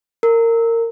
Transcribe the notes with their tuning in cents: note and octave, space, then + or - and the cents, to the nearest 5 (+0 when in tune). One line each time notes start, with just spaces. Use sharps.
A#4 -20